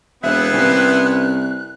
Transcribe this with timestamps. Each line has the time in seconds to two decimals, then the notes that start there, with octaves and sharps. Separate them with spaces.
0.24 E1 B3 C4 E4 E5 F#6
0.54 C2 C#4 B4